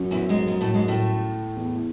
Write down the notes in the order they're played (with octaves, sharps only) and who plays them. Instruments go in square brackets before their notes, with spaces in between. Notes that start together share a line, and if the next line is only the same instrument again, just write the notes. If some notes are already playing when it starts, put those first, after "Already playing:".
Already playing: [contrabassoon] F#2
[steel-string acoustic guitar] E2 E3
G#2 G#3
G#2 G#3
A2 A3
G#2 G#3
A2 A3
[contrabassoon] E2